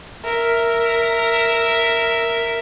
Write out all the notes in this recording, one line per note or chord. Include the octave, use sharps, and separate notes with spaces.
A#4 E5